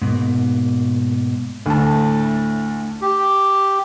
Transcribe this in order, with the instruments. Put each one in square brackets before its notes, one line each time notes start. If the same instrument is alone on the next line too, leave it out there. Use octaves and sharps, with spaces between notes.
[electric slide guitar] G#2 B2 A#3
[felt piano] D2 A5 [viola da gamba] A2 A3
[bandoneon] G4